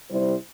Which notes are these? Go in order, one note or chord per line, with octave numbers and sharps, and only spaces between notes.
C3 G3 E4 C5